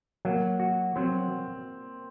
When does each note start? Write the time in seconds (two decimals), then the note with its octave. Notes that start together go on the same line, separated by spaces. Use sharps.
0.25 F#3 A#3
0.60 F#4
0.96 F#3 C4